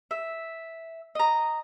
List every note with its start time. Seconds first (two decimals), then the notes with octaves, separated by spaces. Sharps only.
0.11 E5
1.15 D#5 A#5